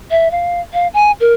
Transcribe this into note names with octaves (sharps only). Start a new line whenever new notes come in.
E5
F5
F5
G#5
A#4